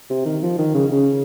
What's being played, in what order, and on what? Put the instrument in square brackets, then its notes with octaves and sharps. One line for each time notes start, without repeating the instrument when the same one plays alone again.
[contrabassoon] C3
D#3
F3
D#3
C#3
C#3